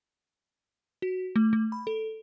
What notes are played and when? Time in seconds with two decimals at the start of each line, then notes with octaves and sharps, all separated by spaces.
1.02 F#4
1.36 A3
1.53 A3
1.72 B5
1.87 A4